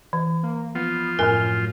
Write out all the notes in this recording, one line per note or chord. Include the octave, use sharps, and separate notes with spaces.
E3
A#3
F3 B3 F4
F#2 A2 A#4 G#5 F6